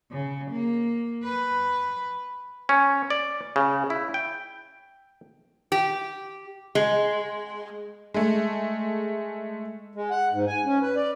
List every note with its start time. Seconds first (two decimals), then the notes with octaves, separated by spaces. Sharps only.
0.11 C#3
0.51 A#3
1.24 B4
2.69 C#4
3.10 D5
3.56 C#3
3.90 E4
4.14 G5
5.72 G4
6.75 G#3
8.14 G#3 A3
9.94 G#3
10.10 F#5
10.32 G#2
10.47 G#5
10.65 C#4
10.82 B4
10.96 D5